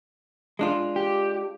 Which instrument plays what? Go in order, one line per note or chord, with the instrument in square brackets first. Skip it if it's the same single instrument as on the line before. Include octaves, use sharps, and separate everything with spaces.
[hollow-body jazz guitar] G#3 D4 F4
[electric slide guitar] G4